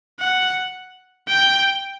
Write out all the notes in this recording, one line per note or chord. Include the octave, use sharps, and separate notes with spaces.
F#5
G5